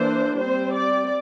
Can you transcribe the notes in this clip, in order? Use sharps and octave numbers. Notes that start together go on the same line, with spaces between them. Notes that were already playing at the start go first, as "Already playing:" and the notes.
Already playing: E3 A#3 D4 C5
G3 C4 C5
D5